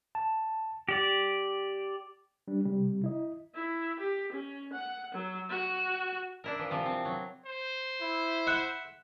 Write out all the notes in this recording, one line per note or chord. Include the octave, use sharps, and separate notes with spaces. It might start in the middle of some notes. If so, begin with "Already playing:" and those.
A5
G4 D5
G3 D4
C3 G3
E4 D#5
E4
G4
C#4
F#5
F#3
F#4
D4 E4 A#4
E3 F3
C3 E3 F3
C4
F#3
C5
E4
E5 F#5